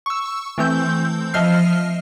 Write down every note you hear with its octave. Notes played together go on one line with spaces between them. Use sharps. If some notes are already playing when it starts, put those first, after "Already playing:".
C#6 E6
E3 A3 C4 E6 G6
F3 D#5 E5 F6 C7